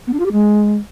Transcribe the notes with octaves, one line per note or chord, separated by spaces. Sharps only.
B3
D4
F4
G4
G#3